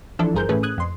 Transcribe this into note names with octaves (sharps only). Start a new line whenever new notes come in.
E3 F3 D4 E4 A4
G1 G2 G#4 A#4 C5 G6
A2 E3 A3 C#4 G#4 B4
D#6 F#6 G#6
F2 C6